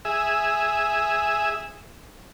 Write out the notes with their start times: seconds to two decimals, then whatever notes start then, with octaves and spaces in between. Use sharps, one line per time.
0.05 G#4 E5